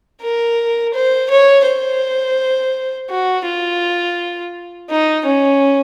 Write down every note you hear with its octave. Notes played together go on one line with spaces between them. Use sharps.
A#4
C5
C#5
C5
F#4
F4
D#4
C#4